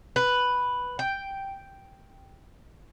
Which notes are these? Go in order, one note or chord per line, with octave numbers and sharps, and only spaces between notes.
B4
G5